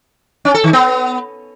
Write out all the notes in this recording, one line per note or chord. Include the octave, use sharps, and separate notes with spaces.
C#4
A4
D#3
B3